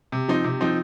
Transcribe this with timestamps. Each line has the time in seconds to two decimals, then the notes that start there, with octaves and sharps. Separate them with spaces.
0.12 C3
0.28 F3 C4 D#4
0.44 C3
0.61 F3 C4 D#4